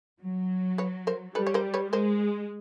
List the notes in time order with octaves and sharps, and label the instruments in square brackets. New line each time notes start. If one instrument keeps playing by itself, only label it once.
[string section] F#3
[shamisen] B4 C#5
A#4 C5
[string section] G3 [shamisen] A4 B4
[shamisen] C#5
A#4 C5
B4 C#5
[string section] G#3 [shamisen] A#4 C5